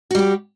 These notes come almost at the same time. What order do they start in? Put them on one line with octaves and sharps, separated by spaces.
F#4 G3 G4